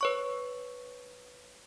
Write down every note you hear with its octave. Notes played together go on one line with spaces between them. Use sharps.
B4 C#5 C#6